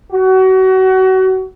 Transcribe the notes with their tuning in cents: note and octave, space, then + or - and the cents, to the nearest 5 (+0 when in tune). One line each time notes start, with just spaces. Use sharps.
F#4 +30